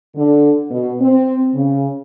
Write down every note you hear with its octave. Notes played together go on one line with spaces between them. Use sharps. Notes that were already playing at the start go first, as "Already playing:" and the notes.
D3
B2
C4
C#3